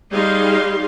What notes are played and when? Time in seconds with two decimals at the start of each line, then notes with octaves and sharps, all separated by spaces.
0.12 G3 D#4 G#4 F5 C6